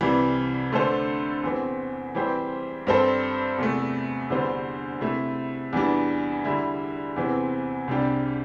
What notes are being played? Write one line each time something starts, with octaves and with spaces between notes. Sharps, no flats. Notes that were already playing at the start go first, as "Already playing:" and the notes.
C2 C3 E3 G3
D3 A3 D4 A4 C5
E2 E3 C4
E3 G3 C4 G4 C5
G2 G3 C4 A4 C5
E2 C3 A3
E2 D3 G3 D4 C5
C3 A3 E4
E2 E3 G3 D4
D3 G3 E4
E2 C3 E3 C4
C2 C3 G3 D4 G4